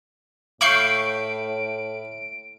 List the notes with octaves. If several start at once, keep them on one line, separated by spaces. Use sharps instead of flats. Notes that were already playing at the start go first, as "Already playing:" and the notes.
A2 E5 F5 B5 C#6 G6 C7 D7